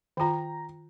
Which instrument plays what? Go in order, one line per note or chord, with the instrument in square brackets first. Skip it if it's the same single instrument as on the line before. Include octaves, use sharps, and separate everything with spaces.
[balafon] D#3 F4 [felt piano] G5 A#5